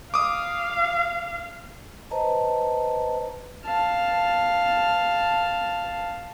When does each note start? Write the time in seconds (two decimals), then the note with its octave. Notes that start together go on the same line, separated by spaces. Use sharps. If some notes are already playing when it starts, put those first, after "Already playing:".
0.14 F5 D6 D#6
2.11 B4 C5 D#5 A5 A#5
3.65 F5 A5